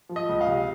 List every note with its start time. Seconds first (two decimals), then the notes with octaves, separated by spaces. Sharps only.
0.09 F3
0.16 D#5
0.29 C#2
0.41 F5
0.47 C3